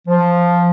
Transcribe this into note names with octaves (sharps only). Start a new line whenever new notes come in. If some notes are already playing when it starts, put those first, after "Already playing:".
F3